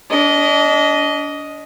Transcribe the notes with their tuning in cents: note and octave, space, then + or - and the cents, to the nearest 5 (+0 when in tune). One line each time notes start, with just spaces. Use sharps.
D4 -35 D#5 +0